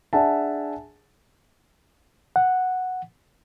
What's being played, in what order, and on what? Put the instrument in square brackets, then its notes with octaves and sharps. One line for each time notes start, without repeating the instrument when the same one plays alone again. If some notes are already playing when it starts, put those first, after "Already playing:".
[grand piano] D4 G#4 E5 F#5 G#5 A5
[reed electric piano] F#5